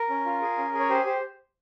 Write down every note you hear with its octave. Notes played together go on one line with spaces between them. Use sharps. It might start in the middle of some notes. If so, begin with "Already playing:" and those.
Already playing: A#4
C#4
F4
G#4
C#4
G#4
C#5
G4 C5
G4 C5